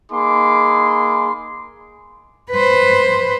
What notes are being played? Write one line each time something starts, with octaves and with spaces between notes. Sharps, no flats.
A#3 D#4 G#4 B5 C6 D6
B4 C5